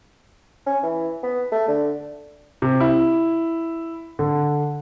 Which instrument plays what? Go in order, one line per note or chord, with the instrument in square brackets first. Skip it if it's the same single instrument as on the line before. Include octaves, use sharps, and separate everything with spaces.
[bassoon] C#4
E3
B3
A3
D3
[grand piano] C3
E4
D3